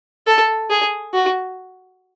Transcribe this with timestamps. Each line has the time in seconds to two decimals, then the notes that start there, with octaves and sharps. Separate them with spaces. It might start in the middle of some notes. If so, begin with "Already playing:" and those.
0.27 A4
0.70 G#4
1.14 F#4